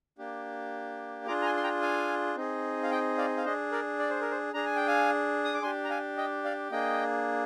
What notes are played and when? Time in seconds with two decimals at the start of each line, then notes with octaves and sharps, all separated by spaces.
0.18 A#3 D4 G4
1.27 D4 F4 G#4 A#5 D6
1.42 A#5
1.45 G#5 C6
1.57 C6
1.64 G5 A#5
1.82 F5 G#5
2.36 C4 D#4 G#4
2.83 F5
2.91 D#5 G5
3.18 D5 F5
3.37 F5
3.45 D4 G#4 C5 D#5
3.72 A#4 D5
3.99 D5
4.10 C5
4.21 A#4
4.31 C5
4.54 D4 G#4 A#5
4.65 G#5
4.76 G5
4.88 F5 G#5
5.45 D#6
5.54 D6
5.63 D4 G4 G#5 C6
5.84 A#5
5.90 F5 G#5
6.17 D#5 G5
6.44 D5 F5
6.71 A#3 D4 G#4 D#5 G5